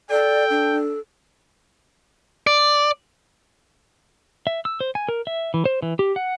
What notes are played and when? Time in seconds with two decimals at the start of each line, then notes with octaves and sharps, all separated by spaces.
0.10 A4 D5 G5
0.50 D4
2.47 D5
4.47 E5
4.65 E6
4.81 C5
4.95 G#5
5.09 A#4
5.27 E5
5.54 E3
5.65 C5
5.82 E3
5.99 G4
6.16 F#5